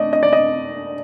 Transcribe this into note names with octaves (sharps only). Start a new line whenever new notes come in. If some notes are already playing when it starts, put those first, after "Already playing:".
Already playing: A3 D5 D#5
D#5
D5
D#5